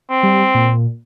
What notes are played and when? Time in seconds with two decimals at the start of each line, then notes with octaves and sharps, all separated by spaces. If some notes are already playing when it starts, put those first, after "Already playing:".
0.10 C4
0.23 G3
0.55 A#2